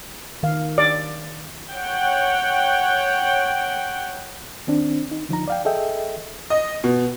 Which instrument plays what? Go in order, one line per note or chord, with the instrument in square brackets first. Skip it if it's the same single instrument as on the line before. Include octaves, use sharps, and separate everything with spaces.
[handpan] D#3 F5
[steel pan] D5
[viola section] C#5 F#5 G5
[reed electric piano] D#3 C4 D4
D#4
D3 F3 D#4 A#5
D5 F5 G5
G#4 A4 D#5 E5 G5
[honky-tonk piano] D#5
B2